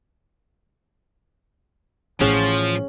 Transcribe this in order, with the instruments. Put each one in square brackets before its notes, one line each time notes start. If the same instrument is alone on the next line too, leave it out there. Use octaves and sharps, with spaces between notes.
[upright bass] A1 [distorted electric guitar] F3 [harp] C#4 G#4 F#5